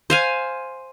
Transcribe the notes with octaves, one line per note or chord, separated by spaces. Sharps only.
C5 F5 G#5